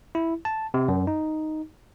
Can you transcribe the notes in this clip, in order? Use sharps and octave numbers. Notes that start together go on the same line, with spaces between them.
E4
A5
C3
F#2
D#4